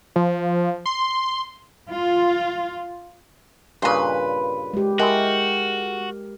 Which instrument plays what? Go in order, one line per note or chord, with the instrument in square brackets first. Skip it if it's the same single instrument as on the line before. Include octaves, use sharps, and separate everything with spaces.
[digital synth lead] F3
C6
[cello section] F4
[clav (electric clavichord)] G2 A#2 C#3 [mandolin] B4 C6
[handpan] G#3 G4
[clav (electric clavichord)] G#3 E4 [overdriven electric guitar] F#4 [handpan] A#4 [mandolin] G5